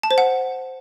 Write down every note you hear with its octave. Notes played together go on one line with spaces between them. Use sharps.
A5
C5
F#5